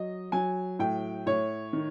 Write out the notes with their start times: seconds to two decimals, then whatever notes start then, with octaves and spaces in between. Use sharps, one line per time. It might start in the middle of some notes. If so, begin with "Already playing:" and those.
Already playing: F#3 D#5
0.32 F#3 G#5
0.79 A2 G5
1.26 A2 C#5
1.73 D#3